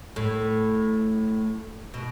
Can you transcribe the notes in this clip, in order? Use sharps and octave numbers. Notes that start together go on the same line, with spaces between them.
A2
B2